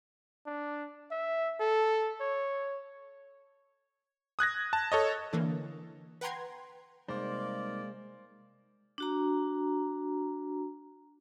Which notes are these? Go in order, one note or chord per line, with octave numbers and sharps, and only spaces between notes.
D4
E5
A4
C#5
D#6 F#6 G#6 A#6
A5
A4 C#5 D#5
D3 E3 A#3
B4 F#5 G5 A#5 C6 G#6
C3 G3 G#3 A#3 D#4 C5 D5
D4 F#4 A#5